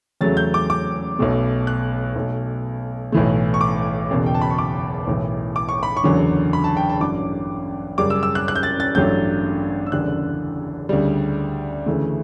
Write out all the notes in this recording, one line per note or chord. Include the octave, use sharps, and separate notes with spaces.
E2 C#3 F#3 A3 A6
G6
D6
D6
B1 B2 A3
F#6
B1 B2 A3
B1 A2 E3 A3
C#6
D6
F#1 E2 B2
G5
A5
B5
C#6
D6
B1 A2 E3
D6
C#6
B5
C#6
F#1 E2 D3 F#3
B5
A5
G5
A5
A1 G2 F#3 D6
F#2 C#3 G3 D6
E6
E6
F#6
F#6
G6
A6
A6
A1 G2 F#3 A3 G6
E6
F#1 E2 D3 G3 F#6
D2 C#3 G3
D2 C#3 E3 A3